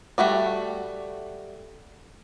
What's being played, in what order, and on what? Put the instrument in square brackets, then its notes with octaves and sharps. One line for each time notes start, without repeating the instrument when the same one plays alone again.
[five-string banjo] G3 A3 F#4 D5